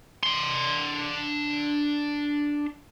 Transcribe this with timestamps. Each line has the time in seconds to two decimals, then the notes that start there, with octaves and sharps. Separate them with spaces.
0.23 D4 C6